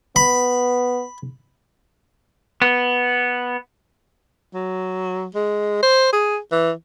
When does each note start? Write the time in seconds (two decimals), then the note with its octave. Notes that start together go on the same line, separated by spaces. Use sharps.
0.16 B3 B5
2.62 B3
4.54 F#3
5.35 G#3
5.83 C5
6.13 G#4
6.52 E3